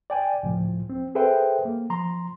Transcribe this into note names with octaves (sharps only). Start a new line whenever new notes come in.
D5 G5 G#5
C#2 A2 F3
C4
G#4 A4 B4 C5 E5 G5
A#3
F3 A#5 C6